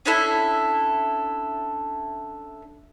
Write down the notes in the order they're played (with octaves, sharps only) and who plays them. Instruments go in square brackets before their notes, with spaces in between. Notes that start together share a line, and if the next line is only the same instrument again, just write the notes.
[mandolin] C#4 D4 E4 A4